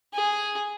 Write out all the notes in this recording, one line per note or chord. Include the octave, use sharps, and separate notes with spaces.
G#4